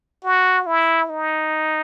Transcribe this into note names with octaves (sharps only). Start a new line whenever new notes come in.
F#4
E4
D#4